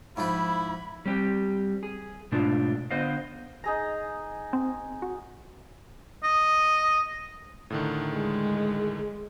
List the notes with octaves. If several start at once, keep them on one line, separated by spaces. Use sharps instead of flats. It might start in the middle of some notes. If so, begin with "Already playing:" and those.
G#2 F3 E4 G5 B5
G3 C4 G4
G#4
G#2 B2 A3 D4 F4
D3 B3 C5 D#5 F5
D#4 G#4 A#5
C4
F#4
D#5
A2 D3 D#3
G#3